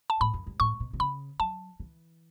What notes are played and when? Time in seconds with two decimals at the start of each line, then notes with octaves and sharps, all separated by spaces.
0.10 A5
0.21 A2 B5
0.33 F#2
0.47 G2
0.60 A2 C#6
0.80 B2
0.93 B2
1.00 C#3 B5
1.40 F#3 A5
1.80 E3